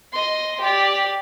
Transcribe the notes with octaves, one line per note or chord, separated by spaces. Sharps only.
D#5 C6
G4 D5